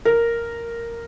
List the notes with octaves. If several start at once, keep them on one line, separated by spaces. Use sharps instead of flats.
A#4